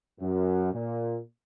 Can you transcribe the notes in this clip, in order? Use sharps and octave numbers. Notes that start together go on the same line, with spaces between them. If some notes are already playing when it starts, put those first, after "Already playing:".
F#2
A#2